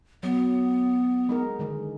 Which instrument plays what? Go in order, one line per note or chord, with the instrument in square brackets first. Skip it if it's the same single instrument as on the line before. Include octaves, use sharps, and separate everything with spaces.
[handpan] F#3 [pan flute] B3
[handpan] G#3 D#4 A#4
D3 D#3 G#3